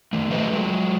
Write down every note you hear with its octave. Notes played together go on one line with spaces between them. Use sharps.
D#3 A3
F#4 A4 B4 C5 D#5 E5
F#3 G#3